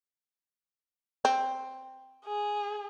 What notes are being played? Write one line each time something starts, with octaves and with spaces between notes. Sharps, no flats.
C4
G#4